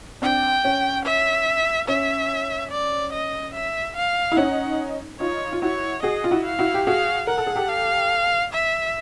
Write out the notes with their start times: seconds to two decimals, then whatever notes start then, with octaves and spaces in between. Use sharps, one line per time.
0.22 C4 D4 G5
0.65 C#4
1.05 E5
1.88 C#4 E5
2.71 D5
3.13 D#5
3.54 E5
3.96 F5
4.32 E4
4.37 C#4 D#4 F#5
5.20 D#4 F4 C#5
5.53 F4
5.62 E4 F#4 C#5
6.03 F#4 G#4 D#5
6.24 F4
6.31 E4 F#4
6.45 F5
6.59 E4 F#4
6.74 G4
6.87 F#4 G#4 F5
7.27 A#4 F#5
7.38 A4
7.47 G#4
7.56 G4 A4
7.69 F5
8.53 E5